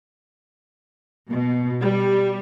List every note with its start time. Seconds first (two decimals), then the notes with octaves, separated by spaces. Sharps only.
1.31 B2
1.82 G3